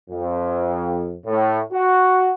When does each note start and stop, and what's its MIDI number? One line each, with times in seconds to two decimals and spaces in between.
0.11 1.16 41
1.26 1.60 45
1.73 2.34 66